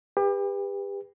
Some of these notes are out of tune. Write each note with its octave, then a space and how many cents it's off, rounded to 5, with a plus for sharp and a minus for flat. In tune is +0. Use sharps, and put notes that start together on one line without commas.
G4 +35 B4 +0